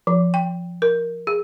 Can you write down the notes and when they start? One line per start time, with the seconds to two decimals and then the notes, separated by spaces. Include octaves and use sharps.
0.07 F3
0.34 G5
0.82 A#4
1.27 G#4